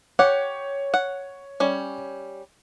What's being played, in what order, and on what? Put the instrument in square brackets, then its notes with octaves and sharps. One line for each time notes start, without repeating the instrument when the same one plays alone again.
[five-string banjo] G4 F#5 [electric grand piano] C#5
[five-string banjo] F#5
G3 C#4